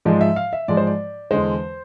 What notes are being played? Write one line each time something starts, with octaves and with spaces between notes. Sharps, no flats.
G#2 F3 G#3 D5
E5
F5
E5
G#2 F3 G#3 D5
C5
D5
E2 D3 G#3 C5